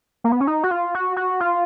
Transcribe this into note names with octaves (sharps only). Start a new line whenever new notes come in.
A#3
B3
C#4
D#4
F#4
F4
F#4
F#4
F4